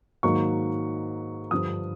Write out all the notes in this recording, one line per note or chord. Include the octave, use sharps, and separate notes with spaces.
G#2 D#3 F#3 A#3 C#6
G2 D3 F3 D#6